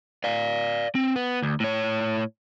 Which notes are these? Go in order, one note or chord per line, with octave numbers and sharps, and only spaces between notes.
D5 F5
C4
B3
D2
A2 C#5